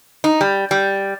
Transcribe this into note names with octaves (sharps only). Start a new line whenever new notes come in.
D#4
G3
G3